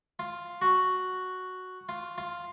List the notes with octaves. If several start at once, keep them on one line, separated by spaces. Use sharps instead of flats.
F4
F#4
F4
F4